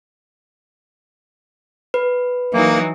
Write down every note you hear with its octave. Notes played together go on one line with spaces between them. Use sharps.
B4
E3 F#3 A#3 D#4